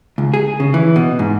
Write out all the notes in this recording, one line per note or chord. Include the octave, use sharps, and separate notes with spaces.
C#2
G#4
C#3
E3
B2
G#2